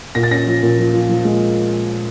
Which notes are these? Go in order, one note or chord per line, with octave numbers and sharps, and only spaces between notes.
A#2 A#6
A6
C#4 A#6
F3
A#2
F3
F3
F3
G#3